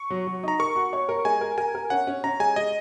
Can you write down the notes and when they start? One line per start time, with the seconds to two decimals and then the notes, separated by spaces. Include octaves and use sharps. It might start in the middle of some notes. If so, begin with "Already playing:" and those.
Already playing: C#6
0.10 F#3
0.27 F#3
0.43 D#4 A#5
0.59 A#4 C#6
0.76 F#4
0.93 C#5
1.09 A#4
1.25 G#3 G#5
1.41 A#4
1.58 A#4 G#5
1.75 A#4
1.90 C#4 F#5
2.07 C#4
2.24 C#4 A#5
2.40 G#3 G#5
2.56 G#3 D#5